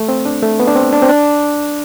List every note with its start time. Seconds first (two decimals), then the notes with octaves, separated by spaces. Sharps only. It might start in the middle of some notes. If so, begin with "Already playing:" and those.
Already playing: A3
0.09 C4
0.25 D4
0.42 A3
0.60 B3
0.67 D4
0.75 C4
0.93 D4
1.02 C4
1.09 D4